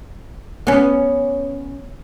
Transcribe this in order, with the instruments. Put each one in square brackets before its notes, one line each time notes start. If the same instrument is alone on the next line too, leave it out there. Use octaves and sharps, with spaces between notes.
[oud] B3 C#4